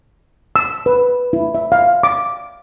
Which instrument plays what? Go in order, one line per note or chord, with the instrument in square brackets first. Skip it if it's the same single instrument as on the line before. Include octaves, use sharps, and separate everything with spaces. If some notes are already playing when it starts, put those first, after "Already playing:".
[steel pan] E6
B4
E4
E5
F5
D6